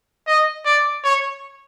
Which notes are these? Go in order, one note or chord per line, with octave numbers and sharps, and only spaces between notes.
D#5
D5
C#5